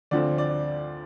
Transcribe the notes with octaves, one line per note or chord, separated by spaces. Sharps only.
D2 D3 F3 C4 D5
D5